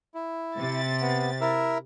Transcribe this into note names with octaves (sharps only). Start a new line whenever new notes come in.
E4
C3 A6
B3
E4 A#4 E5